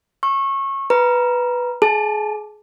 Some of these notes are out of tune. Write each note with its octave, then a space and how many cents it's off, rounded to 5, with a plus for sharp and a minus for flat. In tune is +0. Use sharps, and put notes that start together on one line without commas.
C#6 -25 E6 +15
B4 +0 A#5 +20
G#4 +25 A5 +0